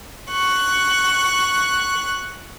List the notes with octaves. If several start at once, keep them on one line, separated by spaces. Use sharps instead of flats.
C#6 F#6